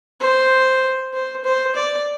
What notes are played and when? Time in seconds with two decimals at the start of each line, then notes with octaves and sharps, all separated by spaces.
0.20 C5
1.13 C5
1.44 C5
1.75 D5